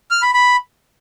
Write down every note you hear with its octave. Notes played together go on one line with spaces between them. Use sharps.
F6
B5
B5